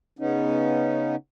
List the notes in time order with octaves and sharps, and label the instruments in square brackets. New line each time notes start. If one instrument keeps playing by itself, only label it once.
[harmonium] C#3 B3 C#4 D#4